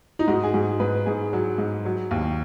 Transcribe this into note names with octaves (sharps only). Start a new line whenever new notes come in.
D#4
G#2 F#4
G#4
G#2 F#4
G#2 B4
G#2 G#4
F#3
G#2
F#3
D#2